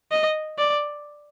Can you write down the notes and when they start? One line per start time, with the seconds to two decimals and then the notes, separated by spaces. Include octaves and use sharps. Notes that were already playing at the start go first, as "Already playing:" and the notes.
0.12 D#5
0.59 D5